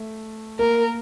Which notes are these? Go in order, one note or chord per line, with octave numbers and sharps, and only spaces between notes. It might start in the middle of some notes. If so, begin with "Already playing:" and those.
Already playing: A3
A#3 A#4